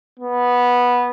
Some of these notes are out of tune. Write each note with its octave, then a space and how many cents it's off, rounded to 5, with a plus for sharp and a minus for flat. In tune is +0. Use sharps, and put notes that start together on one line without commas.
B3 -10